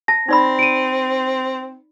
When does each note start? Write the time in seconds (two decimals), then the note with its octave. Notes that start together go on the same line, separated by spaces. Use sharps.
0.08 A5 A#6
0.28 C4 D#4 D5 B5
0.59 D7 D#7